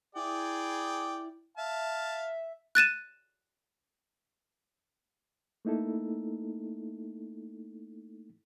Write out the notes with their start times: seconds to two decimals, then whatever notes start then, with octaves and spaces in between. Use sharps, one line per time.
0.16 E4 G#4 D5 G5
1.57 E5 F5 A5
2.75 F#6 A6 D#7 E7
5.65 A3 A#3 D#4 E4 A4